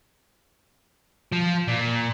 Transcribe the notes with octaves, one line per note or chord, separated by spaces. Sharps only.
F3
A#2